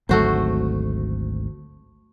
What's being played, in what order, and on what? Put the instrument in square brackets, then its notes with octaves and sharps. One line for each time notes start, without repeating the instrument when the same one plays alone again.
[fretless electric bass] G#1 D2 F#3 [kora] A3 F#4 C5